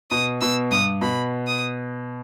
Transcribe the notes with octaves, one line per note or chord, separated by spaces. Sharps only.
B2 D#6
B2 E6
G2 D#6
B2 B5
D#6